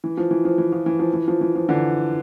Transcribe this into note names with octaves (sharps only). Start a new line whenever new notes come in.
E3
F3
E3
F3
E3
F3
E3
F3
E3
F3
E3
F3
D3 E3